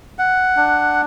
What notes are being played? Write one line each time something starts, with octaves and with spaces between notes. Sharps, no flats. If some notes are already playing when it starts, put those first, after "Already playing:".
F#5
D4